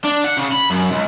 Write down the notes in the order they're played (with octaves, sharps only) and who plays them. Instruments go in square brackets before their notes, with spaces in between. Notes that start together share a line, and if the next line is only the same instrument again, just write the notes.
[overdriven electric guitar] D4
F#5
C#3
B5
F#2
C#2